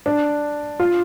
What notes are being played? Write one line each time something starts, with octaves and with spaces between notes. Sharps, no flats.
D4
F4